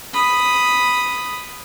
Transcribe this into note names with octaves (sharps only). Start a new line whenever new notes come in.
B5 D#6